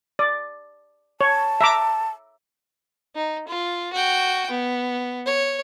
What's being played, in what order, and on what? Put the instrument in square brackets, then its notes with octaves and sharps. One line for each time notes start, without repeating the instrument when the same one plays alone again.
[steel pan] D5
[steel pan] C#5 [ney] A5
[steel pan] E5 A#5 D6
[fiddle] D#4
F4
F#4 G5
B3
C#5